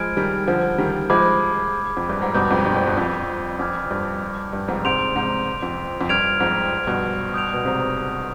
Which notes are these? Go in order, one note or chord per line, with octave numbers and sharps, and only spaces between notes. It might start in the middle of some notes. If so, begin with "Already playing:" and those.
Already playing: F3 G#3 G#5 B5 F6 G#6 D7
D#3 G3
D3 F3
D#3 G3
F3 G#3 B5 D6 G#6
F2
G2
G#2
G2 B2 B5 D6 G6
F2 G#2
G2
G2
G2
F2
F2 G#5 D6 F6 G#6
G2
G2
F2 G#2
G#2 C3 C6 G6 D7 F7
G#2 C3
F2
F2
G2 F6 G#6 D7 F7
F2 G#2
G2 B2
D#6 G6 D7 F7
B2
G#2 C3